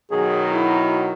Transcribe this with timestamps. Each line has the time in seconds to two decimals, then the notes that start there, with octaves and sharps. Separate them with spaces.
0.11 B2 D#3 F#3 G#4
0.52 E4